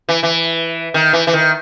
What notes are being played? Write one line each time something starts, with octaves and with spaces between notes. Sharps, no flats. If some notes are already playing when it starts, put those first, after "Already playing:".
E3
E3
D#3
E3
E3
D#3